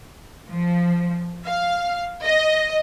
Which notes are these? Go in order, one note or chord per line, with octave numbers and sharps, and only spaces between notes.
F3
F5
D#5